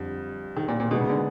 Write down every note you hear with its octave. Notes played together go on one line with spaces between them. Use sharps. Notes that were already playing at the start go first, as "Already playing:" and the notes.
Already playing: F2 D3 G3
D#3
A#2
A#2
B2 D#3 G#3 B3
C#3
D3